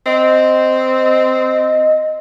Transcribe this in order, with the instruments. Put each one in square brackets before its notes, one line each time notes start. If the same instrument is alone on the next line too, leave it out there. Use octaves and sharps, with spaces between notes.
[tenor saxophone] C4 [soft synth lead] D#5